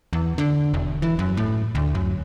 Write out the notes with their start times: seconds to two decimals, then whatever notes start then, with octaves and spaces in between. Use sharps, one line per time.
0.13 E2
0.38 D3
0.74 E1
1.02 E3
1.19 F#2
1.37 A2
1.75 D2
1.95 F#2